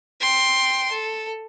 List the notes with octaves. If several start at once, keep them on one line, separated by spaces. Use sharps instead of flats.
G5 C6
A4